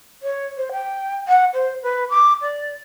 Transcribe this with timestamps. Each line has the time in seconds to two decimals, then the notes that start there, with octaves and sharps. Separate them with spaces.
0.22 C#5
0.57 C5
0.72 G5
1.28 F#5
1.54 C5
1.83 B4
2.10 D6
2.42 D5